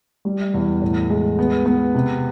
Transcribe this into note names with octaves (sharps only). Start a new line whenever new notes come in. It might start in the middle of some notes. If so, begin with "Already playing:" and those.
G3
E2
A2
G#3
B3
B3
C3